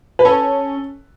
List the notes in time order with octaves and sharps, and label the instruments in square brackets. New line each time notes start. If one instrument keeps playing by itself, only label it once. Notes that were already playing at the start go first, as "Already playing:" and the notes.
[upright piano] B4
[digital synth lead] C#4 [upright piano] A4